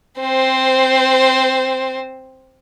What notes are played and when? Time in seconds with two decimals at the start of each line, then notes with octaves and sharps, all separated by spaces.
0.20 C4 C5